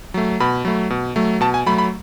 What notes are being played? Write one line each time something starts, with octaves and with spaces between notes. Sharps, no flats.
F#3 A3
B2 B5
F#3 A3
B2
F#3 A3
B2 A5
G#5
F#3 A3 B5
B5